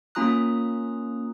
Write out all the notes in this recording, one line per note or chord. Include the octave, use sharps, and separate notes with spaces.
A#3 C#4 F4 A#5 D#6 F#6